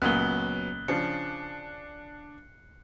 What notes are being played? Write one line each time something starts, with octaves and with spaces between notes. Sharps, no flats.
C#2 A#2 F#3 B3 F#6 F#7 G7
C#3 F3 D4 C7 C#7